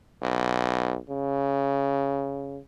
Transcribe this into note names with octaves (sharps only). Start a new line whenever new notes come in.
B1
C#3